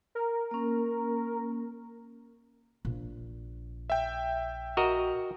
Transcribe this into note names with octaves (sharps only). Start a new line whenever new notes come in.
A#4
A#3 C#4
A#1
E5 G5
F#4 A#4 D#5